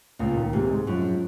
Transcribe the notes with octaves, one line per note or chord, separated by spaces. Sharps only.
C#2 A#2
D#3
G#2 C3
G#3
F#2 F3